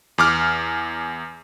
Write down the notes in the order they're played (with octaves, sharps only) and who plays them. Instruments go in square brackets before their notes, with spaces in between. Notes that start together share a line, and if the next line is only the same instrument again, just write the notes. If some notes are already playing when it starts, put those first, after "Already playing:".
[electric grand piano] E2 D6 F6